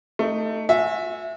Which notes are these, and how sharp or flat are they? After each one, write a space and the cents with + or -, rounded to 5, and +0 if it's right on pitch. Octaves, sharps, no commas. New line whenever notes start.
A3 +15 D#4 +0
F#4 -40 E5 +0 G#5 +0